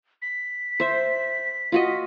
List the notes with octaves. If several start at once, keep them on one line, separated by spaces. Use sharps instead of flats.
B6
C5 E5
F4 F#4 D#5